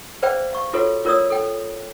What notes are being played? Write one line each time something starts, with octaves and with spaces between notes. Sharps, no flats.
G#4 B4 C5 D5 F5 G5
F5 C#6
F4 F#4 G#4 A4 B4 C#5
F4 A#4 C#5 D5 D#6 E6
A4 G5